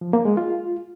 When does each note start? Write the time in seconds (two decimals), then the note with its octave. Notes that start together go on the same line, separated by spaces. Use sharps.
0.01 F3
0.13 A#3
0.25 G#3
0.37 F4